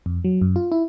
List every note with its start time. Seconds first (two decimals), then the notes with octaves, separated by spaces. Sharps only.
0.06 F2
0.24 F#3
0.41 F#2
0.56 F4
0.72 E4